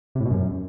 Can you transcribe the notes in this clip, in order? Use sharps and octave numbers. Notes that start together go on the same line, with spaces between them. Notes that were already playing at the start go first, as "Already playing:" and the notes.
C3
A2
B2
F#2